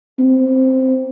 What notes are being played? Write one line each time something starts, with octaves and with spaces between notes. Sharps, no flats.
C4